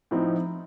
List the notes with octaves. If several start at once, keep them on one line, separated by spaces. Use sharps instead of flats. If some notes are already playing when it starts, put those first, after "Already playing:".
A2 F3 C4 D#4